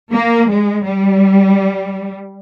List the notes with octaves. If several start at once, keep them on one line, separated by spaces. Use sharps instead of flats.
A#3
G#3
G3